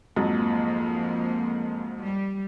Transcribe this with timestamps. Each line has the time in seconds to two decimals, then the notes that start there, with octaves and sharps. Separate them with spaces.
0.16 F2 G#2 F3 F#3 A#3
1.99 G3